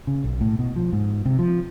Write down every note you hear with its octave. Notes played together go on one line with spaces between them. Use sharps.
C#3
B1
A2
B2
F3
G#2
C3
F3